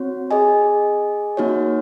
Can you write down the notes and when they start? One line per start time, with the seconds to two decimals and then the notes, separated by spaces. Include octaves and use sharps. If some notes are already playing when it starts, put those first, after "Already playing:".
Already playing: C4 F#4 C#5
0.31 G#4 D#5 G#5
1.37 A#3 D#4 F#4 C#5